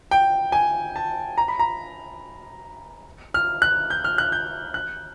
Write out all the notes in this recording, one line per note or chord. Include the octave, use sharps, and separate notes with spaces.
G5
G#5
A5
A#5
B5
A#5
F6
F#6
G6
F6
F#6
G6
F#6